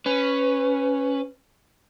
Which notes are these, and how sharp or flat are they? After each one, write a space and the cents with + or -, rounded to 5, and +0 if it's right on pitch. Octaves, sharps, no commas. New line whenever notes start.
C#4 +0 B4 +10